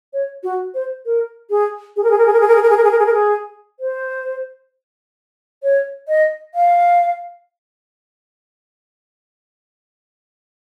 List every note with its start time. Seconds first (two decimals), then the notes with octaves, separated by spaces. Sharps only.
0.13 C#5
0.43 F#4
0.74 C5
1.05 A#4
1.50 G#4
1.96 G#4
2.04 A#4
2.11 G#4
2.18 A#4
2.26 G#4
2.33 A#4
2.40 G#4
2.48 A#4
2.55 G#4
2.62 A#4
2.70 G#4
2.77 A#4
2.84 G#4
2.91 A#4
2.99 G#4
3.06 A#4
3.13 G#4
3.80 C5
5.63 C#5
6.08 D#5
6.55 F5